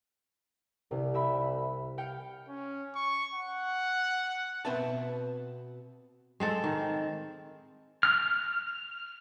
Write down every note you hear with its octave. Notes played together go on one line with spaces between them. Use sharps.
C2 C3
G4 E5 B5
F5 G5 C#7
C#4
C#6
F#5
B2 C4 B4 E5 A5
G#3 C4 A4
D#3
F6